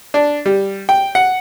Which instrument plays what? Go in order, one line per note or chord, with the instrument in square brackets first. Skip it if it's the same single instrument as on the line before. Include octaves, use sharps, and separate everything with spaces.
[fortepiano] D4
G3
G5
F#5